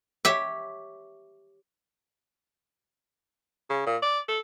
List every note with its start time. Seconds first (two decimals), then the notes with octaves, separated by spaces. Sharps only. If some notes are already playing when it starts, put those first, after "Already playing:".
0.25 G4 C#5 E5
3.70 C#3
3.87 A#2
4.02 D5
4.28 A4